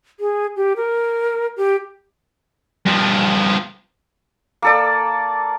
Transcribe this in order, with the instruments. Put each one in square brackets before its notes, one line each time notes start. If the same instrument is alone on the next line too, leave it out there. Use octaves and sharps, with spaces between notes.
[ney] G#4
G4
A#4
G4
[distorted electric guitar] G2 F3
[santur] A#3 A4 D5